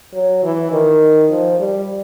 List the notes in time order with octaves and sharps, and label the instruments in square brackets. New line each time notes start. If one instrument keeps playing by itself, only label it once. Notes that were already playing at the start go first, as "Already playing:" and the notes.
[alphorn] F#3
E3
D#3
F3
G3